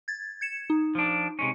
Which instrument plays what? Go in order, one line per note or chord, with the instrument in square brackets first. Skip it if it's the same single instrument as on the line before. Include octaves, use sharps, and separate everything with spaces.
[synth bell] G#6 A6
G#6 C#7 E7
D#4
[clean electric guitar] F3 D4
C3 G#3 C#4